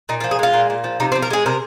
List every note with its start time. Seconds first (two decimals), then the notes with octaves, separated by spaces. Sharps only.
0.09 A#2 D#4
0.20 F4
0.24 F3
0.31 G#4
0.39 G#3 F4
0.53 A#2
0.70 A#2
0.84 F3
1.00 C3 D#4
1.12 C4
1.15 F3
1.22 A#4
1.30 G#3 G#4
1.46 C3 A#4